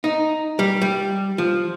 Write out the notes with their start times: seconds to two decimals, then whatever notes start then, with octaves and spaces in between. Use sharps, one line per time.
0.04 D#4
0.59 G3
0.82 G3
1.38 F3